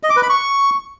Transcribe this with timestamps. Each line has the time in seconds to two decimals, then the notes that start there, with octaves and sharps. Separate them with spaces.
0.03 D#5
0.10 D6
0.16 B4
0.23 B5
0.29 C#6